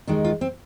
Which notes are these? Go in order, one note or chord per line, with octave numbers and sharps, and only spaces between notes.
D#2 D#3 G#3 D4
F4
C4